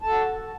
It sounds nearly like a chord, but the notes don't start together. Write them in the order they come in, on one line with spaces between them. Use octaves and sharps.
A5 A4 F#4